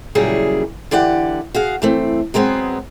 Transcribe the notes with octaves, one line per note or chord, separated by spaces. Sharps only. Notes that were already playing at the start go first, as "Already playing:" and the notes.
A#2 C#3 F#3 G3 E4 G#4
D3 E3 G4 D5 F#5
F#4 G#4 F5
E3 A3 C4
F#3 G#3 B3 C4